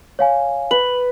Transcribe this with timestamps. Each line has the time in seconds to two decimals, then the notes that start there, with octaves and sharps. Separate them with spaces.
0.19 C#5 F5 G#5
0.71 B4 F#7